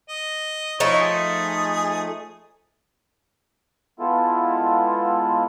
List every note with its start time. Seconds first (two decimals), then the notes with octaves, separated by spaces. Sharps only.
0.09 D#5
0.80 F3 A3 D#4 E4 C#5 D#5
1.01 G#4
4.00 G#3 B3 E4 F4 A4